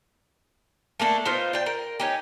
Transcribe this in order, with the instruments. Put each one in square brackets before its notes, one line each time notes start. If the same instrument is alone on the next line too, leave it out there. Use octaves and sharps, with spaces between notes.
[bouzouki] A3 A#3 D4
B3 D#4 F4 C5
D4 G5
A#4
C#4 D#4 G4